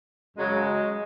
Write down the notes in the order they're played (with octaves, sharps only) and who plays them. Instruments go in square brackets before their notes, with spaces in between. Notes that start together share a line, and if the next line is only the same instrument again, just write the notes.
[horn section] F#2 C#3 F#3 G#3